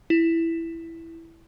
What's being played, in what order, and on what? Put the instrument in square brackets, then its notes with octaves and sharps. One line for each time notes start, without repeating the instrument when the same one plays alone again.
[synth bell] E4